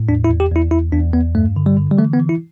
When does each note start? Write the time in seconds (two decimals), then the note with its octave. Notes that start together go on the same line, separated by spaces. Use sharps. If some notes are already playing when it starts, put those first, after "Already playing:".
Already playing: A2
0.09 E2 D4
0.24 E4
0.29 E2
0.40 G4
0.51 E2 E4
0.71 E2 E4
0.92 E2 D4
1.13 E2 B3
1.35 G2 A3
1.56 D3
1.66 G3
1.77 D3
1.91 G3
1.98 E3 A3
2.13 B3
2.20 E3
2.29 E4